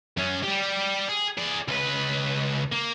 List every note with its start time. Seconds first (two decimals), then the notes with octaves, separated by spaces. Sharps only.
0.17 F#2 C#4
0.43 G3 G4
1.08 G#4
1.38 G#4 D5
1.68 C#2 B4
2.72 A#3